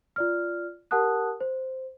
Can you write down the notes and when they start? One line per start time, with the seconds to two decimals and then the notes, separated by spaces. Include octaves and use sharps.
0.16 F4 D5 F6
0.91 G4 A#4 F#5 A5 D#6 F#6
1.41 C5